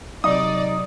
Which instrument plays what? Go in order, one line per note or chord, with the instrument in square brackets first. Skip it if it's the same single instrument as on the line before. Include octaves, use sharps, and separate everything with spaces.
[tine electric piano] C3 F#3 [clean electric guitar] D#4 [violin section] D5 [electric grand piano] D#6